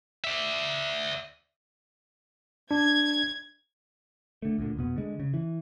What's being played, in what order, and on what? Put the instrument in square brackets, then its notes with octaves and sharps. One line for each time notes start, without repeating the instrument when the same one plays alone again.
[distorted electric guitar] D5 E5
[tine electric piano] D4 [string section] G#6
[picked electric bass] D3 A3
D2 A#2 D3
F1 B2 B3
D3 G#3
C#3
E3